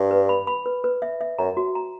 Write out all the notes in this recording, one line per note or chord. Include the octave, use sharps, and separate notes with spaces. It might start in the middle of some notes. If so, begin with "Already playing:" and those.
Already playing: G2
B4
B5
B5
B4
B4
E5
E5
F#2 A#5
F#4
A#5